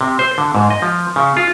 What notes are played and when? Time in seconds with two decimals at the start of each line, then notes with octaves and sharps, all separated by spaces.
0.01 C3
0.19 C5
0.38 D3
0.55 G#2
0.70 D#5
0.82 F3
1.16 C#3
1.37 F4